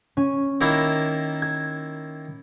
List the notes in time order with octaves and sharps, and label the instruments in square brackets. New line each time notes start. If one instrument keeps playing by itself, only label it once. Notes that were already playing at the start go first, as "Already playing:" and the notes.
[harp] C#4
[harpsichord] D#3 A#3 E4
[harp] G#6